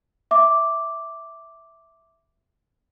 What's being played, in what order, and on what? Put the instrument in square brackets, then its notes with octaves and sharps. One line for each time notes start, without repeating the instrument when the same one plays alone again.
[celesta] E5 D6